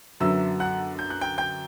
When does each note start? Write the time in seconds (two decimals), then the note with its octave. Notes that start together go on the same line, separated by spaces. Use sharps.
0.20 F#2 D3 F#3 B3 E5 E6
0.60 F#5 F#6
0.99 G6
1.10 F#6
1.21 G5 G6
1.38 G5 G6